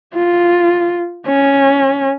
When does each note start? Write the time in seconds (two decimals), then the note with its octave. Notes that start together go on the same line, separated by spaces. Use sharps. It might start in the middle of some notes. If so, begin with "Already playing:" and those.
0.15 F4
1.26 C#4